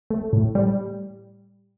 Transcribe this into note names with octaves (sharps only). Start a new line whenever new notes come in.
A3
A2
G3